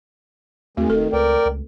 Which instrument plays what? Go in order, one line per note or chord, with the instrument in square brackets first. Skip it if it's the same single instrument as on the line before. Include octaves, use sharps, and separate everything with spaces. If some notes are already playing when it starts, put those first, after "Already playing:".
[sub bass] D#2 [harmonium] D#3 G#3 [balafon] A3 C4 F#4
[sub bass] D#1 [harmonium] D#3 [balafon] A4
[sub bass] C#2 [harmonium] A#4 D5 G5 [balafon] B4
[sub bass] C#2